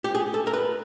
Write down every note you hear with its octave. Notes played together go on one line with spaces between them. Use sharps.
G4
G#4
A4
A#4
B4